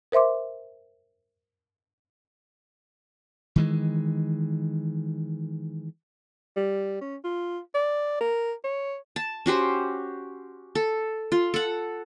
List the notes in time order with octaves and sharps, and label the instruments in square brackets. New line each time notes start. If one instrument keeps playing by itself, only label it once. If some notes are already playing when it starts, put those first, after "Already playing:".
[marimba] A#4 C5 E5 C6 D6
[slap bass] D#3 E3 G#3
[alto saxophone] G3
C#4
F4
D5
A#4
C#5
[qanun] A5
C#4 F#4 G4 C5
A4
F4
A4 F#5